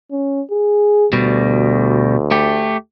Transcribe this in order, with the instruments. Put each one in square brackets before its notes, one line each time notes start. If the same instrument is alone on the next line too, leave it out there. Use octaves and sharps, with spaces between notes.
[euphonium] C#4
G#4
[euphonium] D2 [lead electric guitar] B2 G3
[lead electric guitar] A3 G4